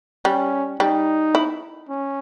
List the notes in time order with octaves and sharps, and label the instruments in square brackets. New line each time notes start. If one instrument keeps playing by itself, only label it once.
[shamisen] G3 [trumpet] C#4
[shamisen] G3 [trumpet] D#4
[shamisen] E4
[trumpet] C#4